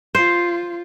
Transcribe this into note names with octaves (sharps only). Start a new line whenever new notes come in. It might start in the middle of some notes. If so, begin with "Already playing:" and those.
F4 C5